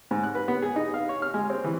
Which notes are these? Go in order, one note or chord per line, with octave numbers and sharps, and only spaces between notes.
G#2
F#6
B4
B3
G#4
D#4
F5
C#5
F6
G#3
C4
E3